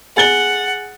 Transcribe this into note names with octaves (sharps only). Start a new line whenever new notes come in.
G#4 F#5 A6 G7